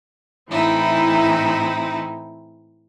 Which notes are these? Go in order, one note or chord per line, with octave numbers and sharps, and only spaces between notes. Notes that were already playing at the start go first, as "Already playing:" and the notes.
A2 E3 C4 D#4 E4